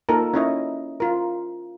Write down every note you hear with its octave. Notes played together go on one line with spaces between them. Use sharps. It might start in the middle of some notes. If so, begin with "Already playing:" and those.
A#3 D#4 F4 A4 A#4
C#4 D#4 E4 C#5 D#5
F4 A#4